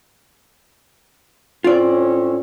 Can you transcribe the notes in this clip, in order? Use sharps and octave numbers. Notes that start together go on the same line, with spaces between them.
A2 C4 C#4 F4 D5